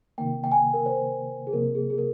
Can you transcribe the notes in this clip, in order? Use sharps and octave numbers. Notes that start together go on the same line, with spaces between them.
C3 D#3 A#3 G5
G5
G#5
A#4
C5
G#4
C3 F3 A#3 A#4
G#4
G#4
A#4